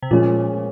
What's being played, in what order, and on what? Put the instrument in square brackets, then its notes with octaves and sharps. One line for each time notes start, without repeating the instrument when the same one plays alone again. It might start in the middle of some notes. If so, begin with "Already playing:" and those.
[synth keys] C3
[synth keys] A#2 [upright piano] F3 G#3 C#4 F4